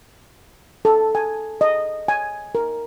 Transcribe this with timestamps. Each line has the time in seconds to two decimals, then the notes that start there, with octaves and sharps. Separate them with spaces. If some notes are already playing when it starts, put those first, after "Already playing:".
0.85 A4
1.15 G#5
1.61 D#5
2.08 G#5
2.55 A#4